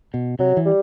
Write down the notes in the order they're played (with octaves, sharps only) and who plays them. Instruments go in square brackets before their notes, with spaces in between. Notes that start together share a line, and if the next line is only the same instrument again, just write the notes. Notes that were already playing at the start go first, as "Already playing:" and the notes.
[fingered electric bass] B2
[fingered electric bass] C3 [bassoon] F#3
[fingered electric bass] E3
[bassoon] G3